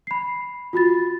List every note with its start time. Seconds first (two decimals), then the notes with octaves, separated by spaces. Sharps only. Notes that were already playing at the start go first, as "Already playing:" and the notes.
0.07 B5 C7
0.73 F4 F#4 B5 A6